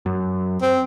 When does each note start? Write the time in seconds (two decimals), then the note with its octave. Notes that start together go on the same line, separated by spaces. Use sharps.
0.06 F#2
0.62 C4